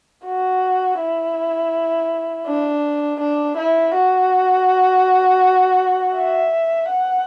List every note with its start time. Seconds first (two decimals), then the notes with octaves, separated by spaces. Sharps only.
0.25 F#4
0.99 E4
2.47 D4
3.21 D4
3.58 E4
3.95 F#4
6.17 E5
6.91 F#5